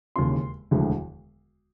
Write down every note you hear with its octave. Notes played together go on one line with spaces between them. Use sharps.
E1 D#2 C#3 C6
E1 D2 D3 F3 G#3